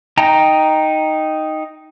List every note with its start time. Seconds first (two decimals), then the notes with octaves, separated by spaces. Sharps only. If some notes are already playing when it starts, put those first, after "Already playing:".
0.17 D#4 G5 A#5